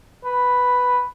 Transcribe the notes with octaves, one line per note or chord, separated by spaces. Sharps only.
B4